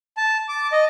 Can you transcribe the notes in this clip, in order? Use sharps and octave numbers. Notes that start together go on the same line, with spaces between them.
A5
D6
D#5